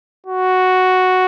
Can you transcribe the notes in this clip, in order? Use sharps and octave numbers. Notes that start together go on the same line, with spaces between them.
F#4